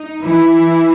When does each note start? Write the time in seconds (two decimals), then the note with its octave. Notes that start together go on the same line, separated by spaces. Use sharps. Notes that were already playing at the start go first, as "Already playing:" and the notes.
Already playing: D#4
0.23 E3 E4